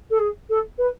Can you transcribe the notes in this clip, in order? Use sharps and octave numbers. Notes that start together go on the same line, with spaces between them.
A4
G#4
A4
B4